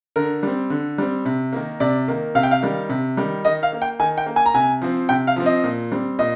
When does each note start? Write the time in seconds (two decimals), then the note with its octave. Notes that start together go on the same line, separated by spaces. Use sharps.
0.16 D3 A#4
0.43 G3 C4
0.70 D3
0.98 G3 C4
1.25 C3
1.53 D#3 A#3
1.80 C3 D5
2.08 D#3 A#3
2.35 C3 F5
2.43 G5
2.51 F5
2.63 D#3 G3
2.89 C3
3.17 D#3 G3
3.45 D#3 D#5
3.63 F5
3.72 A#3
3.82 G5
4.00 D#3 G#5
4.18 G5
4.26 A#3
4.36 G#5
4.46 A#5
4.54 C3 G#5
4.82 F3 C4
5.09 C3 G5
5.27 F5
5.36 F3 C4
5.46 D#5
5.64 A#2
5.92 G3 C4
6.19 A#2 D#5